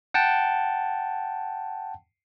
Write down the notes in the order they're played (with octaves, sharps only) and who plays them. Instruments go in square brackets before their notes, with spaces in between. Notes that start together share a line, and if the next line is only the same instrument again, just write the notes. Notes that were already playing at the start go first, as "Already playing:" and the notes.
[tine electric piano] F#5 G5 A5